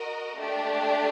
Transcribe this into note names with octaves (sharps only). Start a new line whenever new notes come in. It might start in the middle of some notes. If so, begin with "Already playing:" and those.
Already playing: F#4 A#4 D#5
A3 D4 G4